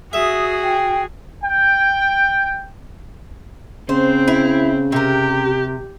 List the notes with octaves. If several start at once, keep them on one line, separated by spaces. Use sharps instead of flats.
F#4 G#4 E5 D#6
G5
G5
C#3 C4 C5
E4
C3 G4 A#4